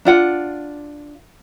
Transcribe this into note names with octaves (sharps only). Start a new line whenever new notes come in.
D4 F4 F#5